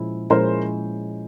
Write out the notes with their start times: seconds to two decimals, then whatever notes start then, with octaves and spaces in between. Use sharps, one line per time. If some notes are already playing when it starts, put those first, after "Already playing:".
Already playing: A#2 F3 G#3 C#4 E4
0.30 A#2 F3 G#3 C#4 E4 A#4 C5